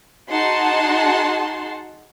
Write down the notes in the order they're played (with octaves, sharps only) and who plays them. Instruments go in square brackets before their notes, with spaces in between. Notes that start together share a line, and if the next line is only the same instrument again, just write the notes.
[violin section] D#4 F#4 G#4 F#5 A5 C6